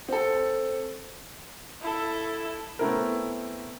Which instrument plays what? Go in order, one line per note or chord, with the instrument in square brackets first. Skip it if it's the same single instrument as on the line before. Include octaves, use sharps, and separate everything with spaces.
[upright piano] C4 A4
[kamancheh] E4 A4
[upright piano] A3 B3 C4 E4 A4 A#4